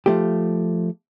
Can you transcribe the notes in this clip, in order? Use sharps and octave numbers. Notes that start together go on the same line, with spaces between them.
F3 A3 G4